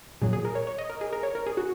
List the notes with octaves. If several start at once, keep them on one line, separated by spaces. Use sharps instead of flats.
A#2 F#3 G#4
G#4
A#4
C#5
C#5
D#5
A#4
G#4
A#4
C#5
A#4
G#4
F#4